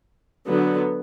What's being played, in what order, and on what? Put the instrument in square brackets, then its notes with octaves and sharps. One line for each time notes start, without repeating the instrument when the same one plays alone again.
[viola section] D3 F#3 B3